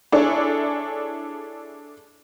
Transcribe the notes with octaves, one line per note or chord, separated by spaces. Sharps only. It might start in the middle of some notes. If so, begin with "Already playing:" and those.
D4 E4 G#4 A4 C#5 D5